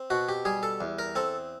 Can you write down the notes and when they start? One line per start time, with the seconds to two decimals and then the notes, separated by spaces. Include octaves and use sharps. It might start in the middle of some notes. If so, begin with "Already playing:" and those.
Already playing: C4
0.10 B2 F#4
0.29 G4
0.45 G3 G#4
0.63 A4
0.81 E2
0.99 A#4
1.15 C4 A4